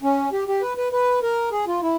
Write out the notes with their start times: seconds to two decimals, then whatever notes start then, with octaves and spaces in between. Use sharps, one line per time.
0.03 C#4
0.32 G4
0.48 G4
0.62 B4
0.77 B4
0.92 B4
1.23 A#4
1.52 G#4
1.67 F4
1.82 E4